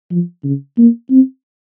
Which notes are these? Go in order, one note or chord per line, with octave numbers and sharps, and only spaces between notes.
F3
C#3
A#3
C4